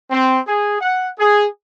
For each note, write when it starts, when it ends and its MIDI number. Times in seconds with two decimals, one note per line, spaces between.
0.11 0.38 60
0.47 0.78 68
0.79 1.07 78
1.19 1.45 68